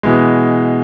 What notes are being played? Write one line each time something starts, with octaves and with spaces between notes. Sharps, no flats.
B2 E3 G#3